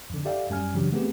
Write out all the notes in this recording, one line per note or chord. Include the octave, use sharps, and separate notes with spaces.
F2 D3
G4 A4 D5 E5 F5 G5
F#2 G3 G#5 F6
C#3 E3 F#3 D4 G4
A3 B3 C4 G4 G#4